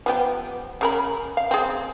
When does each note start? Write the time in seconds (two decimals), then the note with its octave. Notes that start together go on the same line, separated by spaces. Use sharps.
0.06 F3 B3 G4
0.81 C#3 A#4 B5
1.37 F5
1.51 C4 G#4